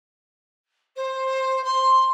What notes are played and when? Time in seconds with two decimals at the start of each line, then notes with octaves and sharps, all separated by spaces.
0.96 C5
1.64 C6